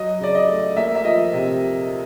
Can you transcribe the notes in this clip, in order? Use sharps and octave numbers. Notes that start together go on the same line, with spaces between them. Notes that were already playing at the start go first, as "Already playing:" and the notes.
Already playing: F#3 D#5
C#3 D5
D#5
A3
A#3 E5
E5
F3 D#5
C3